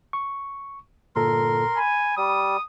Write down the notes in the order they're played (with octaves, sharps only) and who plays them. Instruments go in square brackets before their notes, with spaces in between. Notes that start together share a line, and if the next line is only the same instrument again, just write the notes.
[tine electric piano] C#6
[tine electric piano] G1 A#2 A4 [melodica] A#4 C6
[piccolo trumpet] G#5 [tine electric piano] B5
[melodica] G3 [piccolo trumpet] D#6